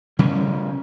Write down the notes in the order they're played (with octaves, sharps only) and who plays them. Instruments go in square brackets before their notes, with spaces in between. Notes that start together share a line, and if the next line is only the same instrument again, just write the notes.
[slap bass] C#3 G3 C#4